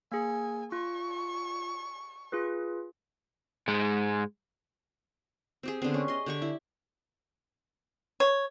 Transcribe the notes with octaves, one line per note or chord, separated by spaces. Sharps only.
A#3 G#4 G#5
F4 C#6
F4 G#4 B4
G#2 G#3
C4 G4 G#4
D3 B3 C4
C#4
D#5 C6
D3 G4 C#6
E4
C#5